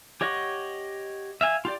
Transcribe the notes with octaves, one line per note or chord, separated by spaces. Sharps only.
G4 C#5 D#5 F#5 C#6
E5 F5 G#5
F4 G4 D5